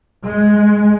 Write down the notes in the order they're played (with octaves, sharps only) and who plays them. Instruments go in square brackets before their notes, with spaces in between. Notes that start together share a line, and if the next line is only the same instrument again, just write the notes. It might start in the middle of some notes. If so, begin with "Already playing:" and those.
[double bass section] G#3